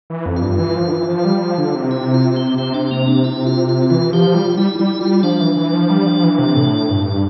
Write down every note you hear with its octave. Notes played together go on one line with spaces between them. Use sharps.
E3
F2
F4
G2
E3
F3
D3
E3
F3
G3
F3
D3
C3
E4
F4
C4
C3 C4
D4
A#3
D4
E4
F4
F4
E3 F4
F3 G4
G3 F4
G3 E4
G3 E4
G3 F4
F3 D4
E3
E3
F3
G3
F3
E3
C3
A2
G2